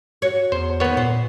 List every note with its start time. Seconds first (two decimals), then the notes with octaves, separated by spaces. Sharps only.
0.22 F#4 C#5
0.52 E2 C5
0.80 D#3 A#3 B3 C#5
0.97 A#2 C5